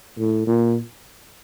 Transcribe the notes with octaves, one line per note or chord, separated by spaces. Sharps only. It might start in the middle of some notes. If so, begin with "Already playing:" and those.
A2
A#2